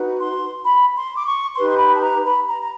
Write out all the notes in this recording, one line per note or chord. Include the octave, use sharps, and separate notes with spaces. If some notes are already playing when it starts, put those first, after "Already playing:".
Already playing: D#4 F#4 B4
C6
B5
C6
D6
C#6
D#4 G4 B4 C6
C6
B5
A5
A#5
B5
A#5
A#5